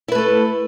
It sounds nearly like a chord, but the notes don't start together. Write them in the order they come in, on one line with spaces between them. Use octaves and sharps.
E4 B4 A3 A4